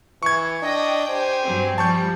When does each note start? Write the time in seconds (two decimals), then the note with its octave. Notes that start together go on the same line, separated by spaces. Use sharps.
0.23 E3 C#6 G#6
0.63 D4 D#5 G5
1.09 G4 C5 G#5
1.45 G2 F#3 C4
1.78 F3 G3 A5 C#6 G6